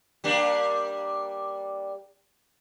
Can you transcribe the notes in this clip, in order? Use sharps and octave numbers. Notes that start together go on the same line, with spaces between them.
G3 A#3 D4